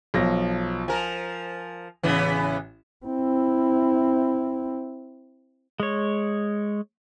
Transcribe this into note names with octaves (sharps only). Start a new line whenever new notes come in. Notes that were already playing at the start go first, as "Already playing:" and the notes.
B1 F3 A#6
F3 A#4 G#5
A1 C#3 E3 B3
C4 E4
G#3 C#5